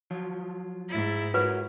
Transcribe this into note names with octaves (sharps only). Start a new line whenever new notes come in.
F3 F#3 F4
G#2 E4
F4 F#4 A#4 B4 C#5